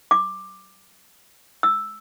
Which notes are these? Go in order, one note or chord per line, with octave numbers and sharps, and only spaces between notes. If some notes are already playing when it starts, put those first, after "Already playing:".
D6
E6